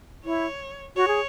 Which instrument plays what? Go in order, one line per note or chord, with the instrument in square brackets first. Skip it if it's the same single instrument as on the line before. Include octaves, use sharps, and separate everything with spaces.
[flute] E4 [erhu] C#5
[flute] F#4 [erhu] C#5
[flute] G#4